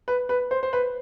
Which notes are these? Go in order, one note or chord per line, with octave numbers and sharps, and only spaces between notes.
B4
B4
C5
C5
B4